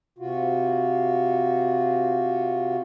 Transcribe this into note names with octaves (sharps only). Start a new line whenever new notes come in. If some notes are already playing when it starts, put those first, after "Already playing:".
C3 F4 F#4